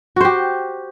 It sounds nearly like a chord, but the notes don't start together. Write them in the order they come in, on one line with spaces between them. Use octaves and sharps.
F#4 C5 G4